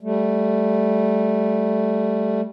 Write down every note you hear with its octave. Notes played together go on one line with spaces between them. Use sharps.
G3 A3